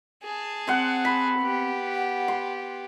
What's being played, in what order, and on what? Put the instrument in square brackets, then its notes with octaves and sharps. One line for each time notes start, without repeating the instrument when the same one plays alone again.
[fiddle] G#4 A5
[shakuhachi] C4 [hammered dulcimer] F#5 C6
[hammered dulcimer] B5
[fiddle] B3 G4
[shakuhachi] F#5
[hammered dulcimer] C6